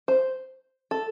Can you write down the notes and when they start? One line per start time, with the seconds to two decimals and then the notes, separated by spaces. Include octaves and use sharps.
0.08 C5
0.91 A4